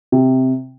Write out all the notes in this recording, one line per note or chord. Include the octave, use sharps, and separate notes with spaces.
C3